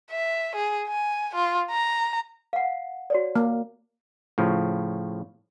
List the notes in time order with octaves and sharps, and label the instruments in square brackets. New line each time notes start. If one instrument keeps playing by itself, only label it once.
[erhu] E5
G#4
G#5
F4
A#5
[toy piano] F5 F#5
F#4 C#5 D5
[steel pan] A#3
[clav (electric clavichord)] A2 C#3 F3